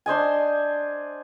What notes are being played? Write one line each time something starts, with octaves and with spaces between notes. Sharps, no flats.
D4 C5 D#5 G#5